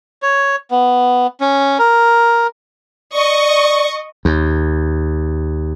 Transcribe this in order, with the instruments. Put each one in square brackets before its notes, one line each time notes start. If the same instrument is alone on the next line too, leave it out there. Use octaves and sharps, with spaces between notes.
[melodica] C#5
B3
C#4
A#4
[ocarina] D5 [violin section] D#5 C#6
[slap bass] D#2